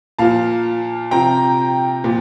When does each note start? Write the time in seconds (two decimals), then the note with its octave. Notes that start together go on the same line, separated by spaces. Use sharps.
0.19 A#2 F3 F5 A5
1.11 C3 F3 G5 A#5
2.04 A#2 F3